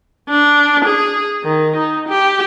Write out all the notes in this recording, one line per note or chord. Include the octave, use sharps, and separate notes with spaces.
D4
G#4
D#3
D#4
G4